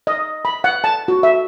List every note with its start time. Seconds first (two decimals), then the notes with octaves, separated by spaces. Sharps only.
0.07 D#5
0.45 B5
0.64 F#5
0.84 A5
1.08 F#4
1.23 E5